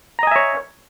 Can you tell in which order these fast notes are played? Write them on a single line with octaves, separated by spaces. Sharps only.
A#5 D#5 G#5 E5 C#5